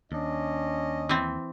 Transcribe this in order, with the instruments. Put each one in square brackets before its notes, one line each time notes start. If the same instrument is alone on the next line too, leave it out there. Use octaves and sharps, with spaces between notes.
[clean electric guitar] D#2 [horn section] C#4 D#5 [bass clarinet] D4
[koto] E3 C4